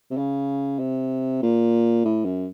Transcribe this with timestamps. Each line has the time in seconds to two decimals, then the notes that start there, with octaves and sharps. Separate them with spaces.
0.11 C3
0.17 C#3
0.79 C3
1.42 A#2
2.05 A2
2.25 F#2